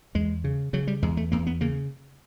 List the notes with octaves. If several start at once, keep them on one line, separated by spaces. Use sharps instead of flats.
E2 G#3
C#3
C#3 F#3
G3
E2 G#3
A3
E2 A#3
B3
C#3 A#3